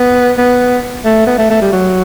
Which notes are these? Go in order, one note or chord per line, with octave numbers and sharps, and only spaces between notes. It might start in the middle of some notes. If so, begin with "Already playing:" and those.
Already playing: B3
B3
A3
B3
A3
A3
G3
F#3